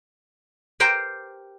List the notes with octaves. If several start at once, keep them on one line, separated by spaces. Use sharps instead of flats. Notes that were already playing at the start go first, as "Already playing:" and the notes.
G4 A#4 C5 G5 A#5